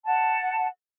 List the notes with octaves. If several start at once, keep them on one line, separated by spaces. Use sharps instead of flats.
F#5 A5